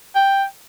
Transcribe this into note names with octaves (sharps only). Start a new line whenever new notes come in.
G5